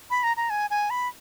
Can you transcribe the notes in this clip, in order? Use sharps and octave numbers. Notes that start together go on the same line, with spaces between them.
B5
A#5
A#5
G#5
G#5
B5